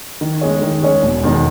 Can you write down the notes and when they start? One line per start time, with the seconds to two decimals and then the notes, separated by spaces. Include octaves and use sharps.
0.21 D#3
0.41 G#3 C#4 G#4 C#5
0.62 D#3
0.82 G#3 C#4 G#4 C#5
1.03 E1
1.23 E2 D#3 G#3